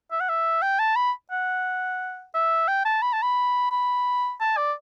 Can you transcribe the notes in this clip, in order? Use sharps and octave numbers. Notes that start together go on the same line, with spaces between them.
E5
F#5
E5
G5
A5
B5
F#5
E5
G5
A5
B5
A5
B5
B5
A5
D5